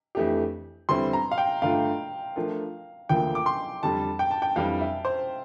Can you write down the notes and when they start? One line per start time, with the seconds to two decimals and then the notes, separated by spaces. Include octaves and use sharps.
0.15 F2 E3 A3 D4 G4
0.89 E2 D3 G3 C4 E4 C6
1.13 A#5
1.31 F5
1.38 G5
1.62 G2 D3 A3 D4 F4 F5
2.36 F3 A3 D4 F4 A#4
3.09 D2 D3 F3 A#3 G5
3.35 D6
3.46 C6
3.83 F2 D3 G3 A5
4.19 G5
4.31 A5
4.42 G5
4.56 F2 E3 G3 D4 F5
4.80 E5
5.05 C5